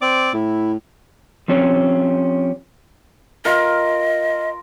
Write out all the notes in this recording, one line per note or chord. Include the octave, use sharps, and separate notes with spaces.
C4 D5 D6
A2 E4
F3 C4 C#4 G4
F4 A#4 D#5